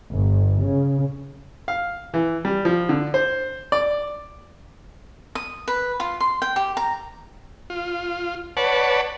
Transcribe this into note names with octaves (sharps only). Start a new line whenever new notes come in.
G1
C#3
F5
E3
G3
F3
D3
C5
D5
D#6
B4
F4
C6
G5
G4
A#5
F4
B4 C#5 D5 F#5 A5